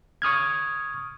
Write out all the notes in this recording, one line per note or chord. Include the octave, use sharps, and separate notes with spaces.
C#6 D#6 F6 G#6